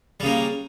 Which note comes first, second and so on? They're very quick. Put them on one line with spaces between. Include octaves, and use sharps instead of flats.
G3 C#3 A#3